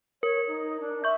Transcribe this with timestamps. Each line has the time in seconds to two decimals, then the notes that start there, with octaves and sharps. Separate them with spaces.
0.23 A#4 C#5
0.48 D#4
0.81 D4
1.04 E5 C#6 G6